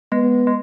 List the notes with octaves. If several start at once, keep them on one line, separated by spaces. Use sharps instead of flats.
G#3 B3
G#3